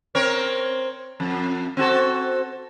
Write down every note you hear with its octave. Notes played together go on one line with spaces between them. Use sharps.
C4 A#4 C#5
F2
C4 F#4 A4